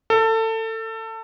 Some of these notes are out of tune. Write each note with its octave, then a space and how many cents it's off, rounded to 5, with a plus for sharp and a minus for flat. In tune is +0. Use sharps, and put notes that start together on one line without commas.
A4 +25